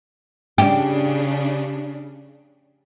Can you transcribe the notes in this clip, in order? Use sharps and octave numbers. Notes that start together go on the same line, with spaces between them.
C#3 D4 G4